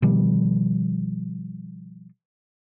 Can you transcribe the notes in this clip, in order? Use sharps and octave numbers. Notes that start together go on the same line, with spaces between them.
B2 D#3 F3 G3